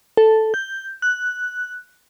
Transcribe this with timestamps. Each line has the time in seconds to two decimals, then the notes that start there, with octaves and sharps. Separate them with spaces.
0.17 A4
0.54 G6
1.02 F#6